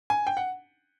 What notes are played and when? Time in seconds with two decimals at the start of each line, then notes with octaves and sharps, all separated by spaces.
0.10 G#5
0.27 G5
0.37 F#5